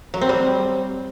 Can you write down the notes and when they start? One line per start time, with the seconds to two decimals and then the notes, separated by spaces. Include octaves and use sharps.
0.14 F#3
0.21 C4
0.29 G3